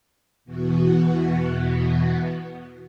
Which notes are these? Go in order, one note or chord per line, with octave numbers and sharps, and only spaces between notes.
E2 B2 E3 B3 F#4